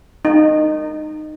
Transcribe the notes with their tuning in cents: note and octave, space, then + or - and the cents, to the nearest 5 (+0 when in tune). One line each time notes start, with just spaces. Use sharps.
D#4 -20